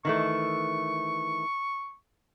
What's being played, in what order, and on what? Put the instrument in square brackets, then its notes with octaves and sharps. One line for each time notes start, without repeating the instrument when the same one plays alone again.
[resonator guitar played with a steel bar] D#3 E3 A3 [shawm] C#6